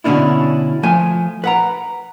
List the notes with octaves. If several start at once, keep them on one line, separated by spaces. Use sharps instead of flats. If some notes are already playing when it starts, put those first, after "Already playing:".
B2 D3 C#4 D4 E4
F3 A3 G#5
B4 F#5 A#5